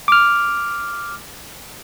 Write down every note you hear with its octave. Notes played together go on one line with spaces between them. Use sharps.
D6 F6